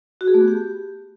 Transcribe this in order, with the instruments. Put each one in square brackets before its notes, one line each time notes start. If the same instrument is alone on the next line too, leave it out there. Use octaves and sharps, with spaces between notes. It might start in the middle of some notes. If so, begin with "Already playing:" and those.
[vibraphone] F#4
G#4
A3
B3
G4